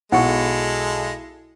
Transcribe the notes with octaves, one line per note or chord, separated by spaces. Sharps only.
B1 G#3 E4 A4 F#5 C#6 C#7